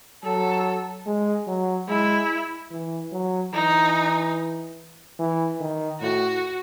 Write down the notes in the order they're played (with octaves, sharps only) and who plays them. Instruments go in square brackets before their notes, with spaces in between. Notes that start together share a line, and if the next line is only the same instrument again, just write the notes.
[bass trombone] F#3 [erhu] A4
[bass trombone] G#3
F#3
[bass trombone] G#3 [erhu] E4
[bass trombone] E3
F#3
[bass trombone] E3 [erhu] D#4
[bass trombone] E3
D#3
[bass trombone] A2 [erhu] F#4